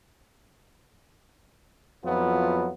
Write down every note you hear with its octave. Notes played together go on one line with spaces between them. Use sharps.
F2 F#3 B3 E4 F4